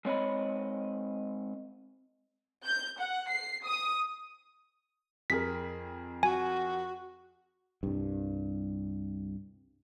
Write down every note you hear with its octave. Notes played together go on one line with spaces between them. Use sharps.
G#3 C4 C#5 D#5 B5
G6
F#5
C7
D#6
F2 G#4 A#4 B6
F#4 G#5
C2 G2